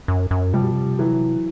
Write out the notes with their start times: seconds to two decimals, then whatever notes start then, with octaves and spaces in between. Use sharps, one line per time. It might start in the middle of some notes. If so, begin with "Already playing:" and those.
0.08 F#2
0.31 F#2
0.53 C3 F3 G3
0.63 B2
0.72 C3
0.99 E3 F#3